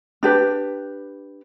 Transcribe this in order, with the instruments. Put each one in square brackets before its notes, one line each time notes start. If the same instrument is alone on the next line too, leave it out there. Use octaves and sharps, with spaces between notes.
[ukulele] D4 G4 B4